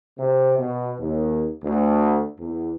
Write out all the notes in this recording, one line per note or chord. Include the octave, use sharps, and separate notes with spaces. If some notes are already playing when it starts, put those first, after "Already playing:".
C3
B2
D#2
D2
E2